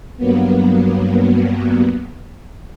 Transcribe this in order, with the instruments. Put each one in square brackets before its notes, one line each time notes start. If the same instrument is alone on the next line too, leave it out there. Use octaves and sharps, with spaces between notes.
[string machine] G2 F#3 A#3 B3